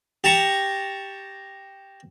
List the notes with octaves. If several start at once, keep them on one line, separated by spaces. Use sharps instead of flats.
G4 A5 A#5 C#6